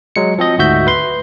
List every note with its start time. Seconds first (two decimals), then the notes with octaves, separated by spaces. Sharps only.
0.16 F#3 G#3 C#7
0.38 F3 C4 D#5
0.58 D2 G#2 F#4 E5 G6
0.87 B4 C6